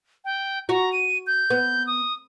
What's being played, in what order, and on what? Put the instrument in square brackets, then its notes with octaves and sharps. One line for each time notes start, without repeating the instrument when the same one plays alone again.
[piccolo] G5
[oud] F#4 [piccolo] A#5
[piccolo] D#7
G6
[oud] B3
[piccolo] D#6